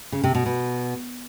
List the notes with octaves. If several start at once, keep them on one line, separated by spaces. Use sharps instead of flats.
C#3
C3
B2
B2